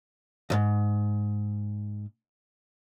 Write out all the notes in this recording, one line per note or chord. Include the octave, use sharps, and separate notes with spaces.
D2 G#2